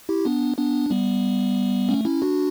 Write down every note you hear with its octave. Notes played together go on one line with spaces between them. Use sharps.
E4 G4
B3 D4
B3 D4
G3 B3
A3 C#4
C#4 E4
D4 F#4